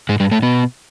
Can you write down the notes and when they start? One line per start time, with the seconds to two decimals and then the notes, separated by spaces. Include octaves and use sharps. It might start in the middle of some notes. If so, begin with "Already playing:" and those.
0.09 G#2 G#3
0.20 G2 G3
0.31 A2 A3
0.42 B2 B3